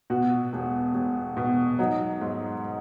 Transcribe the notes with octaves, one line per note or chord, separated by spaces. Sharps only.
B2 F#4
E1
E1
B2
F#3 D#4
G#2